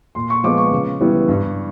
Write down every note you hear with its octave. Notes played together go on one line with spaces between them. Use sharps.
A#2 C6
C#6
F3 G#3 B3 D6
C#6
C#3
E3 G3 B3 E4
G2